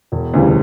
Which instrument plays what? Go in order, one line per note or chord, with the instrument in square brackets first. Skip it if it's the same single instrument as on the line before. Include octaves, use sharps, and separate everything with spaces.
[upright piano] E1
D2 C#3 E3 G3